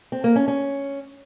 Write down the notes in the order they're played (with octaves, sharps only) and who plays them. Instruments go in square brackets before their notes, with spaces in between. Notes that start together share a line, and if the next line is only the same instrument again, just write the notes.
[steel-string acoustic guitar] C4
A#3
C#4
C#4